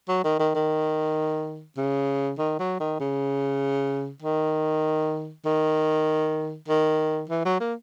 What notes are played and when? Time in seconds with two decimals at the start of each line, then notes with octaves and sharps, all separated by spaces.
0.09 F#3
0.24 D#3
0.39 D#3
0.55 D#3
1.77 C#3
2.38 D#3
2.59 F#3
2.80 D#3
3.00 C#3
4.22 D#3
5.45 D#3
6.68 D#3
7.29 E3
7.45 F#3
7.60 A#3